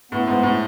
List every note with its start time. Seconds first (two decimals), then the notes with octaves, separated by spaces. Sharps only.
0.12 A2 B3
0.27 G#2 B3
0.43 A2